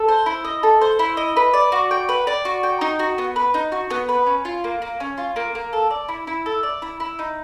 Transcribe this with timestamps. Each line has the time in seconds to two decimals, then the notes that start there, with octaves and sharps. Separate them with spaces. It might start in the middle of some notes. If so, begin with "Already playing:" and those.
Already playing: A4
0.08 C5
0.26 E4
0.44 D#5
0.63 A4
0.81 C5
0.99 E4
1.17 D#5
1.36 B4
1.53 D5
1.72 F#4
1.91 G5
2.09 B4
2.27 D5
2.45 F#4
2.63 G5
2.81 D#4
2.99 F#4
3.18 B3
3.36 B4
3.54 D#4
3.72 F#4
3.90 B3
4.09 B4
4.26 C#4
4.45 F4
4.64 A#3
4.82 A#3
5.00 C#4
5.18 F4
5.36 A#3
5.55 A#3
5.73 A4
5.91 D5
6.08 E4
6.27 E4
6.46 A4
6.63 D5
6.82 E4
7.00 E4
7.19 D#4